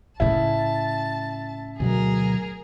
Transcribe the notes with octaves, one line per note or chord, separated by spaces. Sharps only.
A2 C#3 E4 A5
D2 B2 F#3 G#4 A#4